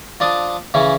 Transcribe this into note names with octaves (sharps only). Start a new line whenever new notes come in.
F3 D4 D5 D#6
C#3 E3 C#4